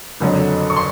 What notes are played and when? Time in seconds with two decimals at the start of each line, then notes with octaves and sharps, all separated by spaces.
0.20 F#1 F2 D3 F#3
0.70 C#6
0.76 C6